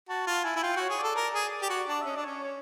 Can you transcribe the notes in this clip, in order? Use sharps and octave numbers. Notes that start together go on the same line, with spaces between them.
F#4 A5
F4 A5
E4 G#5
E4
F4 G5
F#4
C#5
G#4
A4 D5
A#4
G#4
G4
F#4
D4
E5
C#4 D#5
D4 D5
C#4 C#5
C#5